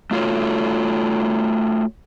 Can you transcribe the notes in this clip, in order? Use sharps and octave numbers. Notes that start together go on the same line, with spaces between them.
A3 F4 F#4 A4 C#5